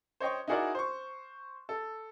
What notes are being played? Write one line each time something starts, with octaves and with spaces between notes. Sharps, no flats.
C5 C#5 D#5 G5 C#6
D#4 E4 F#4 G#4 A#4 D5
C5 C#6
A4